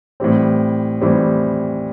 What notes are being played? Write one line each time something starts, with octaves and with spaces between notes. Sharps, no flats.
A2 E3 G3 C4
A2 E3 G3 C4